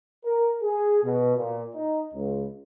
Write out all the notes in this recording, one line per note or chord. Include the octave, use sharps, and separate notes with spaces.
A#4
G#4
B2
A#2
D#4
C#2